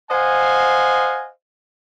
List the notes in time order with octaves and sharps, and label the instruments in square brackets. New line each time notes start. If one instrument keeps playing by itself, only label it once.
[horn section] C5 D#5 F5 F#5 G#5